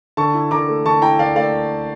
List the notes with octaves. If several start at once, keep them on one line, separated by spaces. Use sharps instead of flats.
D3 A5 C#6
E4
D3 A#5 D6
A3
D3 A5 C#6
E4 G5 A#5
D3 D5 F5
A3 D5 F5